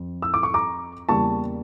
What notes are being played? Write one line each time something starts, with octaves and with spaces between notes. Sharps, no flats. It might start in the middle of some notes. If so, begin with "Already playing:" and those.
Already playing: F2
E6
D6
C#6
A#5 D6
E2 C#3 G3 A#3 A5 C#6